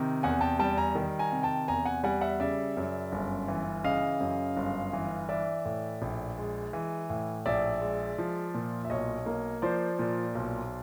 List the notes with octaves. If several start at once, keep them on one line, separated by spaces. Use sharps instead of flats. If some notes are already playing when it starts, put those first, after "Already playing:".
Already playing: C3 D#3
E2 F#5 G#5
G5 A5
G3 G5 A5
G#5 A#5
D#3
G#5 A#5
C3
G5 A5
E2 G#5 A#5
F#5 G#5
G3 F#5 G#5
E5 F#5
C#3 D5 E5
F#2
G1
E3
C#3 D#5 F5
F#2
G1
E3
E3 D5 E5
A2
A#1
G#3
E3
A2
A#1 D5 E5
G#3
F3
A#2
E5
B1 C#5 D#5
A#3
F3 C5 D5
A#2
B1